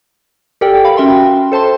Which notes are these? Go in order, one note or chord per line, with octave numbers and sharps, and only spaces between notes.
G4 A4 A#4 D5 G5
F5 B5
C#4 F#4 E5 G5 C6
A4 C5 A5 C6